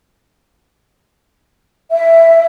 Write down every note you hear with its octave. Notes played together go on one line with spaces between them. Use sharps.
E5